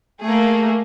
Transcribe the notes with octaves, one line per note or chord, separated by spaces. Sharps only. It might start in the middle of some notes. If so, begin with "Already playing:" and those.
A3 A#3 G#4